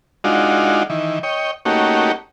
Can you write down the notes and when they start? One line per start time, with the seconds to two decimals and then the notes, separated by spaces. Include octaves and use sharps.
0.24 G#3 D4 D#4 F4 F#4
0.90 D#3 E3
1.23 C#5 D#5 G5
1.65 A3 A#3 C#4 D#4 F#4 G4